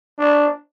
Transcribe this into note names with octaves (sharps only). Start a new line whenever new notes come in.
D4